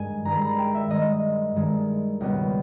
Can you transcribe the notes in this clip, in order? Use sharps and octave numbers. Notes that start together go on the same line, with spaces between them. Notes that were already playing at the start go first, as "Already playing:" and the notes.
Already playing: G2 D#3 G#3 G#5
G2 D#3 G#3 A#5
B5
A#5
G5
E5
G2 D#3 G#3 D#5
G2 D#3 G#3
C#2 B2 G3 B3